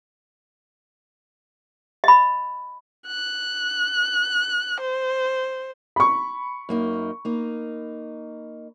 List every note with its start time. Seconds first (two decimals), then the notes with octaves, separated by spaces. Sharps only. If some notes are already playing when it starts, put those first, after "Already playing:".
2.04 D#5 B5
3.07 F#6
4.80 C5
5.96 B5 C#6
6.69 F#2 A#3 D#4
7.25 A#3 D#4